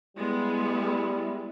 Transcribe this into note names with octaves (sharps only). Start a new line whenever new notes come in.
G3 G#3 B3 E4